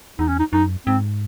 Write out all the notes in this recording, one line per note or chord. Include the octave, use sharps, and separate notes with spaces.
E2 D#4
C#4
D#4
F#2 D#4
G#2 C4